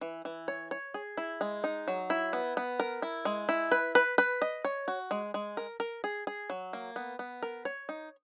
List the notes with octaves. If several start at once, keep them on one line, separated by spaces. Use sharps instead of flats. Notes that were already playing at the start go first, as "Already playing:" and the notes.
E3
E3
C#5
C#5
G#4
E4
G#3
D#4
F#3
E4
B3
B3
A#4
E4
G#3
E4
B4
B4
B4
D#5
C#5
F#4
G#3
G#3
A#4
A#4
G#4
G#4
F#3
A#3
B3
B3
A#4
C#5
D#4